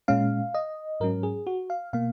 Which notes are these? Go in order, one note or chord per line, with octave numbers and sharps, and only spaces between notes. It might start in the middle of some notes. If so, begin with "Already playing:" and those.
A#2 G#3 C#4 F5
D#5
G#2 F#3 C#4 A#4
G#4
F#4
F5
B2 A#3 F5